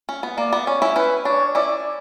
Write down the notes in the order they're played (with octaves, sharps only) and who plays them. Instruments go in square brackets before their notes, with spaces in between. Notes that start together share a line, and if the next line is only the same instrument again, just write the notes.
[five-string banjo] C#4
B3
[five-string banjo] A#3 [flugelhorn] D5
[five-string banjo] B3
[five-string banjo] C#4 [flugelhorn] C#5
[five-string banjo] C#4 E4
[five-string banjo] C#4 E4 [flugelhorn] B4
[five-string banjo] D4 [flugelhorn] C#5
[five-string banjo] C#4 E4 [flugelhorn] D5